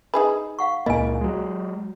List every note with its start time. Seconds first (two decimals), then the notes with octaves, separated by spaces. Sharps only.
0.14 D#4 G#4 B4
0.59 F5 F#5 C#6
0.86 C#2 A#2 A#3 E4 D#5 G#5
1.21 F#3 G#3